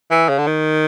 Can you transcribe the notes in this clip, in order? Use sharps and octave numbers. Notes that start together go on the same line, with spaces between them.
E3
C#3
D3
D#3